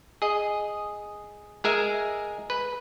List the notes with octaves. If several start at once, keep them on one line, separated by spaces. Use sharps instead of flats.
G#4 D#5
G#3 G#4 A#4 E5 G#5
B4